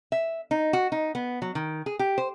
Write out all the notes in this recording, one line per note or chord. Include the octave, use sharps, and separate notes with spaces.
E5
D#4
F#4
D#4
B3
F#3
D#3
G#4
G4
C5